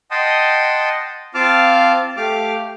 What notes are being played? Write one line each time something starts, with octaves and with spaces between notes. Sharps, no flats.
D#5 F#5 G5 A5 C6 D#6
C4 F4 F5 A5 D6 F6
A3 G4 F5 D6 F6